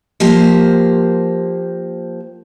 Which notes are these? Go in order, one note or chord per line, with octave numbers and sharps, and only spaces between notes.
F3 A#3 G4 C5